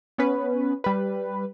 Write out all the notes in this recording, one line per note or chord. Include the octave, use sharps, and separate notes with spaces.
B3 C#4 B4
G3 B4